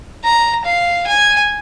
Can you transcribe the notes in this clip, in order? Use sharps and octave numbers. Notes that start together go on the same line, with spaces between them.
A#5
F5
G#5